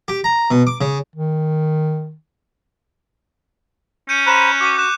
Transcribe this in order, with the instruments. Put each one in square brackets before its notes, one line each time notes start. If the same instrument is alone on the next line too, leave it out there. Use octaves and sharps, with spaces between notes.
[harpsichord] G4
A#5
B2
D6
C#3
[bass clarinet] D#3
[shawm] C#4 [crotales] G6 C#7 D#7
[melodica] C5 A#5 B5 [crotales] F#6 D#7 E7
[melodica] F#4 [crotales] D6
[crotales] D6 F#6 E7